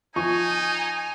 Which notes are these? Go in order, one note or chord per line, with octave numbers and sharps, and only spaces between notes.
F3 D#4 G#5 C#6